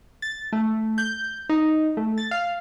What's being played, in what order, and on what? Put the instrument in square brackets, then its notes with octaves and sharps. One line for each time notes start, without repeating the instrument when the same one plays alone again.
[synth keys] A6
A3
G6
D#4
A3
A6
F5